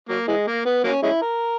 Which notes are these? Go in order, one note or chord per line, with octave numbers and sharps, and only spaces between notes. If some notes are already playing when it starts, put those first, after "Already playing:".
F#3 A#3
E3 G#3
A#3
B3
F#3 A#3 C#4
G#3 C#4 E4
A#4